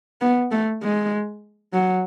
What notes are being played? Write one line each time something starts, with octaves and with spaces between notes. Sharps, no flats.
B3
A3
G#3
F#3